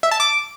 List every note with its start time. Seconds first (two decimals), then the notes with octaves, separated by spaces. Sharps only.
0.03 E5
0.11 A5
0.20 D6